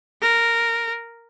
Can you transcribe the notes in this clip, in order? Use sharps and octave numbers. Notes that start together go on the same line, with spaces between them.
A#4